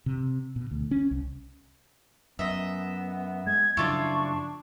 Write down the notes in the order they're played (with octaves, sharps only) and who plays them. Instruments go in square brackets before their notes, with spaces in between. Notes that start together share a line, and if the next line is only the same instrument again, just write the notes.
[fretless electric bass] C3
B2
D2
C#4
C2
[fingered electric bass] F#2 [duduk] B3 [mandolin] D#5 E5
[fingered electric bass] G#3 [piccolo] G#6
[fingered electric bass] F#2 C#3 F3 [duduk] D4 [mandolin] E4 F4 D5 [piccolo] C#6